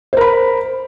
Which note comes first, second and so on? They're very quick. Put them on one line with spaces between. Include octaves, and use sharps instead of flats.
C5 A#4 B5